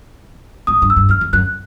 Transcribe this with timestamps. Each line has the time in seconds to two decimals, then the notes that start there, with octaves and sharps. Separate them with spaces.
0.67 G#2 D#6
0.82 G2
0.90 E6
0.97 G2
1.09 F#2 F6
1.21 F2
1.33 F#2 F#6